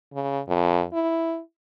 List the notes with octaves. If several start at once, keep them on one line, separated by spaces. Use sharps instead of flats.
C#3
F2
E4